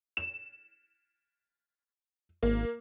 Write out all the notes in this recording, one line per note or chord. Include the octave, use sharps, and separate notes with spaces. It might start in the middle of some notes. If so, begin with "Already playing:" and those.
E7
G#1 A#3